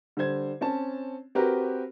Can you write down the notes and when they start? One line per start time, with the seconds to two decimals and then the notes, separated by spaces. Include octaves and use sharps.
0.17 D3 G3 C5 G#6
0.61 C4 C#4 A5
1.35 C4 F#4 G4 A#4 B4